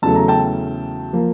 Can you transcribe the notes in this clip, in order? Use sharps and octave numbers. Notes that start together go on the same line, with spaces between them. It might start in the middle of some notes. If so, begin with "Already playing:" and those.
E2 C#3 F#3 A3 A5
A#5
G5 A5
F3 A#3